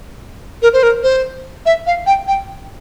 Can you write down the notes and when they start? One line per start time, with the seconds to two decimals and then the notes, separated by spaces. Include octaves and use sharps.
0.62 A#4
0.73 C5
0.83 A#4
1.03 C5
1.66 E5
1.86 F5
2.06 G5
2.27 G5